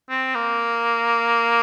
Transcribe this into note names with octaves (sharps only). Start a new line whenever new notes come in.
C4
A#3